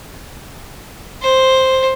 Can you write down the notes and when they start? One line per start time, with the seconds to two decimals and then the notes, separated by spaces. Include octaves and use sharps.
1.22 C5